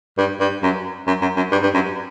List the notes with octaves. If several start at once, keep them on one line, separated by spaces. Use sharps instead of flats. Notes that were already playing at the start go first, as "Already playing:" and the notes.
G2
G2
F#2
F#2
F#2
F#2
G2
G2
F#2